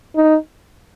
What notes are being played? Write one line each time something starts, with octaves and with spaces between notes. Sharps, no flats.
D#4